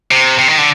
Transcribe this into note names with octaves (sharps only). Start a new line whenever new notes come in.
C3
C3
D#3
D3